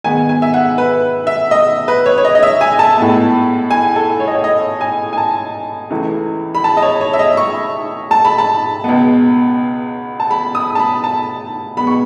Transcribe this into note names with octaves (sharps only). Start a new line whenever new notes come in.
G#2 D#3 G#3 B3 G#5
G#5
E5
F#5
B4
E5
D#5
B4
C#5
C#5
D#5
D#5
E5
G#5
A5
A2 G#3 B3
G#5
A4
C#5
D#5
C#5
D#5
G#5
G#5
A5
C#2 C#3 E3 A3
B5
A5
D#5
C#5
C#5
E5
D#5
C#6
A5
B5
A5
C#2 B2 G#3 B3
A5
B5
D#6
A5
B5
A5
B2 G#3 B3 B5
C#6